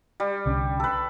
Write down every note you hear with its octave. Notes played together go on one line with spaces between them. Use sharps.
G3
C2 D3 C#4
A4 B4